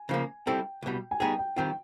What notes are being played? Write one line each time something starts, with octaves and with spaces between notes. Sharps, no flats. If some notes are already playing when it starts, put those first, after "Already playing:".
Already playing: G#5
C#3 F3 A#3
G3 C4 E4 A4 G5
C2 B2 G3
G#5
G3 B3 D#4 G#4 G5
G5
D#3 G3 C4 F4 G5